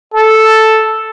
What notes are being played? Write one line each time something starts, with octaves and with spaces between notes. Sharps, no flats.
A4